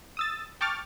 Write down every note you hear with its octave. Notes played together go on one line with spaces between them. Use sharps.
D#6 E6 A6
G5 A5 C#6 D6 F6 A6